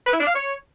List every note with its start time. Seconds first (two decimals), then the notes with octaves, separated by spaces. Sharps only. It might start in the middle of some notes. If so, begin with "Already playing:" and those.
0.07 B4
0.14 E4
0.21 D4
0.27 F5
0.34 C#5